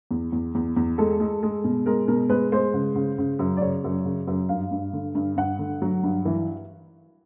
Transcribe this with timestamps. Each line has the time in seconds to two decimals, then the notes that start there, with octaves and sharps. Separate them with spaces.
0.11 E2
0.32 E2
0.55 E2
0.77 E2
0.98 G#3 A4
1.20 G#3
1.43 G#3
1.64 B2
1.86 G#3 A#4
2.08 B2 A#4
2.29 G#3 B4
2.52 G#3 C5
2.74 C#3
2.96 C#3
3.18 C#3
3.39 F#2
3.57 D5
3.61 C#3 C#5
3.84 F#2
4.05 C#3
4.27 F#2
4.49 G2 F5
4.71 G2
4.93 D3
5.15 G2
5.37 G2 F#5
5.59 D3
5.82 F#3
6.03 G2
6.25 E3